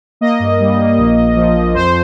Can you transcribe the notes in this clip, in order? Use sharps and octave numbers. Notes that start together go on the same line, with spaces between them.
A#3 D#5
G2
G3
A#3
A#1
A#1
F3
F3
F2 C5